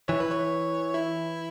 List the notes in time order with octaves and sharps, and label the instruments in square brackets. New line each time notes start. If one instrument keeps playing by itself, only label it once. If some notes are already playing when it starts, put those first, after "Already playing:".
[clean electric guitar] E3 [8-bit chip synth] C#5
[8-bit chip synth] B4
C#5
E4